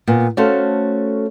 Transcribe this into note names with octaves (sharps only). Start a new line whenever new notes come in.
A#2 B3
A3 C#4 F#4 A4 C5 F5